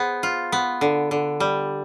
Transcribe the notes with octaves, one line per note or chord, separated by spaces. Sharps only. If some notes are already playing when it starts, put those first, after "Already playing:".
Already playing: B3 G#4 C5
F4
B3
D3
D3
G3